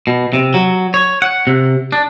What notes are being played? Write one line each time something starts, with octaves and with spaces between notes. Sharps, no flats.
B2
C3
F#3
C#5
F#5
C3
D4